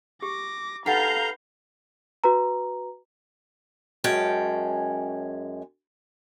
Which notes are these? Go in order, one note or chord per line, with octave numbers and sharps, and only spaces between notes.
G4 D6 A#6
D#4 G4 A4 B4 F5 F#5 A#5 G6
F#4 B4 A#5
F#2 G#3 C#4 G5 A5